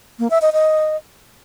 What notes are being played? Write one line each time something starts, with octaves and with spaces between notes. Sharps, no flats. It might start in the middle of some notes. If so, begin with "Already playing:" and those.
A#3
E5
D#5
D#5